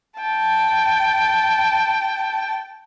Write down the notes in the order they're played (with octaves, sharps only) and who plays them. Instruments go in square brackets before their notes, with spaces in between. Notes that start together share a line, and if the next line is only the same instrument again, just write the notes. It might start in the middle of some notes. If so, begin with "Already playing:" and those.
[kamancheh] G5 A5